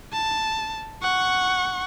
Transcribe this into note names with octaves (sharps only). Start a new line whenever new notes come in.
A5
F#5 C#6